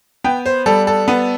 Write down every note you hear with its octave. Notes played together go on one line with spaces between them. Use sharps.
B3 G5
C5
G3 A4
A4
B3